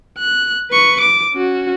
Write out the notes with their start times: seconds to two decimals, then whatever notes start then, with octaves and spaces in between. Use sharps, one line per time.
0.19 F#6
0.71 B4 C#6
1.01 D6
1.33 C#4 F#4